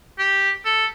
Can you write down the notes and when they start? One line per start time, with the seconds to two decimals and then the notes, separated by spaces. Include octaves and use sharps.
0.19 G4
0.65 A4